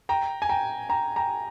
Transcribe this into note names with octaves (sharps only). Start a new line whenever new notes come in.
G5 A#5
G#5
G5 A#5
G5 A#5
G5 A#5